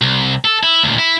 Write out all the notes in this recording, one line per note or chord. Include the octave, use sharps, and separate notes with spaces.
C2
A4
E4
D2 A#2
E4